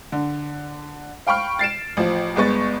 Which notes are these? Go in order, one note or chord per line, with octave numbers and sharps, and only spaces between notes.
D3
F5 G5 B5 C#6 F6
A6 C7 D7 E7
A1 F3
G1 G#3 B3 C#6 A6